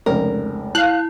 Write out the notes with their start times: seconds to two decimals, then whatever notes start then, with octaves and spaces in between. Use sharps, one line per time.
0.06 F1 C#2 A#4
0.75 E4 F5 F#6